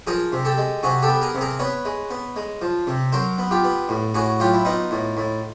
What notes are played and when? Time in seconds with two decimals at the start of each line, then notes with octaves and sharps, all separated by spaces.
0.07 F3 G#4 A#4
0.33 C3
0.45 G4 A4
0.58 G#3
0.83 C3 F#4 G#4
1.02 G4 A4
1.09 B3
1.21 G#4 A#4
1.35 C3
1.41 G#4 A#4
1.59 B3 B4 C#5
1.85 G#3
2.10 B3
2.36 G#3
2.62 F3
2.87 C3
3.12 F#3 A#4 C5
3.38 B3
3.51 F4 G4
3.64 B3
3.89 A2
4.14 A2 F#4 G#4
4.40 F#3 F4 G4
4.53 E4
4.65 B3 D#4 F4
4.91 A2
5.17 A2